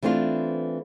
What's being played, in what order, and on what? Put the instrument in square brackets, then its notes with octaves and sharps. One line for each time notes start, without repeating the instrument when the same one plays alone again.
[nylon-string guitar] E3 A3 C4 D4 F4